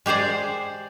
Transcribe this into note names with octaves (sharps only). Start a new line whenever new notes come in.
G#3 G4 G#4 C5 D5